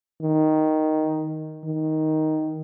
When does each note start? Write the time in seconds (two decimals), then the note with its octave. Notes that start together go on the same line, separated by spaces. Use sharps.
0.22 D#3
1.64 D#3